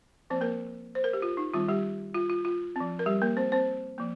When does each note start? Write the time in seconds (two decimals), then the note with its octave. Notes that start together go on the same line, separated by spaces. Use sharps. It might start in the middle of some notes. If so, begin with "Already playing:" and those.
0.30 F3 A#3 C4 C5
0.41 A#3 A#4
0.95 C5
1.04 A#4
1.13 G4
1.22 F4
1.37 D#4
1.53 D#3 G3 C4 F4
1.68 G3 G4
2.14 F4
2.30 F4
2.45 F4
2.76 F3 C4
2.99 A#4
3.06 G3 G4
3.22 A#3 A#4
3.37 C4 C5
3.52 C4 C5
3.98 F3 A#3